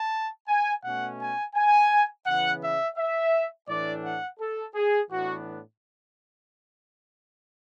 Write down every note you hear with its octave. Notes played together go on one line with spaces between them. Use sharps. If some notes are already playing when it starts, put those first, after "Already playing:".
Already playing: A5
G#5
B2 A3 C#4 F#5
G#5
G#5
C#3 E3 B3 F#5
E5
E5
A2 E3 A3 D4 D5
F#5
A4
G#4
A2 E3 B3 D4 F#4